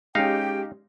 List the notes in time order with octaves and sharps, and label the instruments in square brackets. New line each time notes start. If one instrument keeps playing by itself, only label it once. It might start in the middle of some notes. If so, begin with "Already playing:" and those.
[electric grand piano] G#3 C#4 [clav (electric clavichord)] D#4 F5 [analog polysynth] G4 [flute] G5